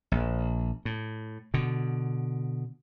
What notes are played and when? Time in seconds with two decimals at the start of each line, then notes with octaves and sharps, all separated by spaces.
0.12 A#1
0.85 A2
1.54 B2 D3